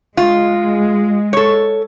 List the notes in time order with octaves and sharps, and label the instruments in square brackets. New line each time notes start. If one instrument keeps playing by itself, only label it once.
[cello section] G#3 [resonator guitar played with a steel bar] F4
[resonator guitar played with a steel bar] A4 C#5